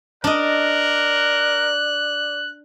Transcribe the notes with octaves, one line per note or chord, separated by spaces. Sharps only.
D4 A#4 D5 D#5 F#6